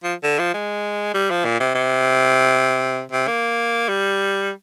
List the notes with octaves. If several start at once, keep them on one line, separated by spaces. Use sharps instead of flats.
F3
D3
F3
G#3
G3
F3
A#2
C3
C3
C3
A#3
G3